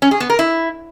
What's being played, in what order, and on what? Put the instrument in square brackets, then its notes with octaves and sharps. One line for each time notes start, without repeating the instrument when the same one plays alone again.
[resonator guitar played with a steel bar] C#4
G#4
B3
A#4
E4